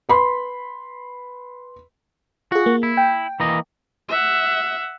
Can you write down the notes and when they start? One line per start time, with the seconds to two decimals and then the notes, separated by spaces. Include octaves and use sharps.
0.09 B4 B5 C6
2.52 F4 F#4 G#4
2.66 A#3
2.83 E4
2.97 G5
3.40 E3 A#3 D#5
4.08 E5 F#5